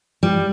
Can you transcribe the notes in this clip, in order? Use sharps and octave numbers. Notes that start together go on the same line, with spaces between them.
G3